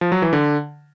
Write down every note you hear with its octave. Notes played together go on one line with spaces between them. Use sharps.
F3
F#3
E3
D3